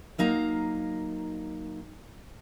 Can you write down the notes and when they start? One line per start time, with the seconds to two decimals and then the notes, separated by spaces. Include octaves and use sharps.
0.18 F#3 A#3 D#4 F5 A#5